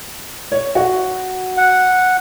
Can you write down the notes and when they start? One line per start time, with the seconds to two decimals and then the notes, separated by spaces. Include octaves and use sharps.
0.52 C#5
0.75 F#4
1.57 F#5